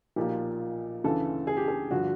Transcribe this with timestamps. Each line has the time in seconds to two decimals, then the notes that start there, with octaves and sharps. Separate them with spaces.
0.16 B1 A#2 F3 G4
1.04 D2 C#3 E3 A4
1.47 G#4
1.57 G4
1.68 G#4
1.91 G2 D3 F3 F#4